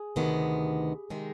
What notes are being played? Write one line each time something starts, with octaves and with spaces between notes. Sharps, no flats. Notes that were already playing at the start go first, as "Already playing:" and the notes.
Already playing: G#4
D2 C3 D#3 B3
C3 D#3 G#3